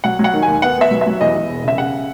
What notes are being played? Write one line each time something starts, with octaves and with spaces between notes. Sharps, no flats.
F#3 F#5
F#3 F#5
D#3
D#2 G#5
B3 F#5
B3 E5
F#3
E5
F#3
E2 D#5
E2
E1
C#3 E5
C#3 F#5